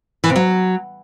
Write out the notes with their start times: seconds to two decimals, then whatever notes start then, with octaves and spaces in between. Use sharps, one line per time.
0.24 E3
0.30 C3
0.36 F#3